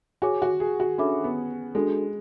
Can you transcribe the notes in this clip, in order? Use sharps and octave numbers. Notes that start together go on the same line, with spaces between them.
F#4 G#4 C#5 G#5 D6
F#4
G#4
F#4
C#4 D4 A4 E5 B5 D6
B3
G#3 D4 F#4 A4